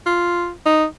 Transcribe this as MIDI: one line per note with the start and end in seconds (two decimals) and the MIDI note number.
0.06 0.50 65
0.66 0.85 63